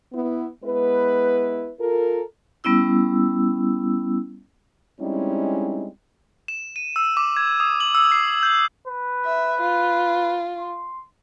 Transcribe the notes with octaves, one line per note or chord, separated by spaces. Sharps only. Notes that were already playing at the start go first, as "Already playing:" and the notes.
B3 E4
G#3 B3 E4 B4
F4 A4 A#4
G3 B3 C#4 E4 E6
G3 G#3 C4 C#4 D#4 E4
E7
D#7
E6
D6
G#6
D#6
F#7
E6
C7
G6
B4
E5
F4
C6